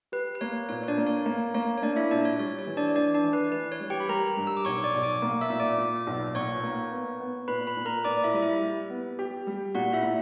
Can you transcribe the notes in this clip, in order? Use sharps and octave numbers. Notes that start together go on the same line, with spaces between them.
G4 B4
B4
A#3 C#5
A#2 C#5
C#5
D4 D5
A#3
C#5
A#3
A#3 C#5
C#5
A#3 D4 D5
E4 E5
A#2 D4 D5
C#5
G3 C#5
C#5
E3
D4 D5
E3 D4 D5
D4 D5
E3
B4
E3 B4
C#5
G3
G4 G5
B5
G3 A#4 A#5
G2
E6
D6
B1 C#5 C#6
D5 D6
B1
D5 D6
A#3
E5 E6
A#2
D5 D6
A#2
B1
A#2 C#5 C#6
A#3
B3
B3
A#2 B4 B5
B4 B5
A#2
A#4 A#5
A#2 D5 D6
D5
E4 E5
G3 D5
E4 E5
G3
B3
G4
G3
A#2 F#4 F#5
E4 E5
A#2